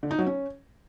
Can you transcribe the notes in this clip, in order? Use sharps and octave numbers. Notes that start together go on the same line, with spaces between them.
D3
D#4
F#3
C#4